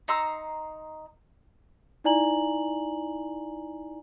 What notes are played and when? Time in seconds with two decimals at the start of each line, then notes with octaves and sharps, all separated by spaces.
0.08 D#4 A#5 C6 E6
2.04 D#4 E4 D5 G#5 A#5 F#7